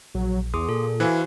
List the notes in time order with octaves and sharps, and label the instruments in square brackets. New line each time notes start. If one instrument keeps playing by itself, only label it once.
[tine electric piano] A#1 [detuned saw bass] F#3
[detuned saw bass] E2 [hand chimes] G#4 [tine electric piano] C6 D6 D#6
[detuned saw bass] A#2 [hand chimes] A4
[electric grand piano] E3 E4 [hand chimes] F#4 C5 [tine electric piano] F5 G#5 F#6